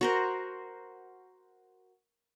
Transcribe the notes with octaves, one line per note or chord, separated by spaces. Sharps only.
F#4 A#4 C5